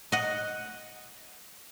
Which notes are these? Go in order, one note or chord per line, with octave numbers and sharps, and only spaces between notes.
D#5 F#5